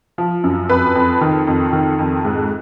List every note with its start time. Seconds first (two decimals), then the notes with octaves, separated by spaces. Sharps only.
0.18 F3
0.44 F#2
0.69 F2 B4
0.95 F2
1.21 D#3
1.47 F2
1.73 D#3
1.99 F2
2.25 G#2